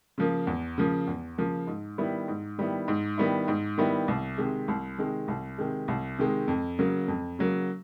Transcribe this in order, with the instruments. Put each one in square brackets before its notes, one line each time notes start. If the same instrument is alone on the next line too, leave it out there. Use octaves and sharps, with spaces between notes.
[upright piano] C#3 F3 A#3
E2
C#3 F3 A#3
E2
C#3 F3 A#3
G#2
D#3 G3 B3 E4
G#2
D#3 G3 B3 E4
G#2
D#3 G3 B3 E4
G#2
D#3 G3 B3 E4
C2
C3 D#3 G#3
C2
C3 D#3 G#3
C2
C3 D#3 G#3
C2
C3 D#3 G#3
F2
C#3 F#3 A#3
F2
C#3 F#3 A#3